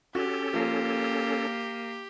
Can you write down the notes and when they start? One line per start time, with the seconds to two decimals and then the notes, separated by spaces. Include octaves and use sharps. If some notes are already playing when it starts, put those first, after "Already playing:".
0.15 C#4 F#4 G4 A4
0.53 F3 A#3